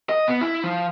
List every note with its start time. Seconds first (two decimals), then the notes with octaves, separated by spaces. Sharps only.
0.09 D#5
0.28 B3
0.41 E4
0.64 F3